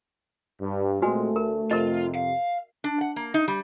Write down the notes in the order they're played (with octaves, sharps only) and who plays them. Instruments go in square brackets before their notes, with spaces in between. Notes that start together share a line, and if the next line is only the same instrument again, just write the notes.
[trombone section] G2
[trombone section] A#2 G#3 C4 [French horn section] A3 [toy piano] F#4 B4 G#5
[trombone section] D2 [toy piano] A#4
[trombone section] F2 C3 [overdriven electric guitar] F4 [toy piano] A#4 D#5
[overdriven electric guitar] F5
[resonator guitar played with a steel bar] D4
F#5
A#3
D#4
G3